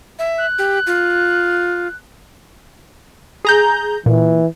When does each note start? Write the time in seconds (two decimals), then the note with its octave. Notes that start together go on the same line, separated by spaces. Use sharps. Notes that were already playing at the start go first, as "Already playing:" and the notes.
0.19 E5
0.37 F#6
0.58 G4
0.87 F4
3.45 G#4 A#5 G6
4.06 A#2 E3